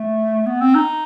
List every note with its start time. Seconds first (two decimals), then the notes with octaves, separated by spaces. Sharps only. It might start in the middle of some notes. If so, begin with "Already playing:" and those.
Already playing: A3
0.46 B3
0.61 C4
0.75 D#4